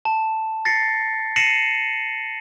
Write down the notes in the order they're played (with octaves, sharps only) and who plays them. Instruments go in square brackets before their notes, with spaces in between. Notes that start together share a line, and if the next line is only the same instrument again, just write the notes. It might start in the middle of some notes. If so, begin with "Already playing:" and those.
[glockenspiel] A5
A6 A#6 C7 C#7
A#6 C7 C#7 D#7 E7 F#7